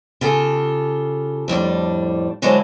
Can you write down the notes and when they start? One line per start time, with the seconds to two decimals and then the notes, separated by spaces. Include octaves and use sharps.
0.21 C#3 F4 G4 A4
1.48 F2 A2 G3 D4
2.42 D3 F#3 G#3 C4 D4 E4